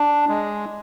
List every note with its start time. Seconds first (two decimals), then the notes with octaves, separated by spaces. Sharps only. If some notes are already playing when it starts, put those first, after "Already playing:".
Already playing: D4
0.29 G#3